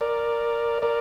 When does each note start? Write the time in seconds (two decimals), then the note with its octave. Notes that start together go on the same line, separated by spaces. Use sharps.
0.01 A#4 D5
0.82 A#4 D5